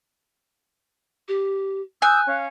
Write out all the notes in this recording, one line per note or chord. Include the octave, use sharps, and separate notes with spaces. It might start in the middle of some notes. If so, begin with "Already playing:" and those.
G4
G#5 D#6 E6 F#6 G6
C#4 F5